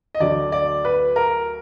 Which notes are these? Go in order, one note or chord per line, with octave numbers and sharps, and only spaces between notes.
D#5
D2 D3 F#3 D5
D5
B4
A#4